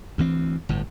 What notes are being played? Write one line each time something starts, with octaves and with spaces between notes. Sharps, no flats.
D2 E3 C4
G1 A2